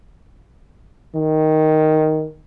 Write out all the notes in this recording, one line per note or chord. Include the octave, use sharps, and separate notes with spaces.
D#3